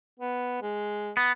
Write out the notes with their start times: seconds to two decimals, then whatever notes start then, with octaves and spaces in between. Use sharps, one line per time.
0.19 B3
0.62 G#3
1.17 B3